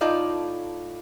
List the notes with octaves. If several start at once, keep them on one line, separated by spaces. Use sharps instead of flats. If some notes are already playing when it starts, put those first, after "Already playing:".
A2 D#4 F4 D5 A5